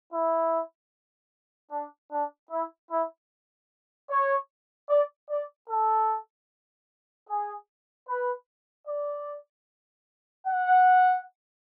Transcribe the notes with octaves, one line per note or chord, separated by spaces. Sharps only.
E4
D4
D4
E4
E4
C#5
D5
D5
A4
G#4
B4
D5
F#5